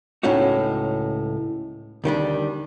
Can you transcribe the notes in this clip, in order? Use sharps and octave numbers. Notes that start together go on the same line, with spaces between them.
C#2 A2 C#4 D#4 F#4
D2 D#3 G3 D4